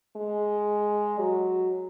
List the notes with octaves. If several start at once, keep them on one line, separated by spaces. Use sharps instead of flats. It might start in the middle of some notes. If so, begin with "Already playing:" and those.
G#3
F#3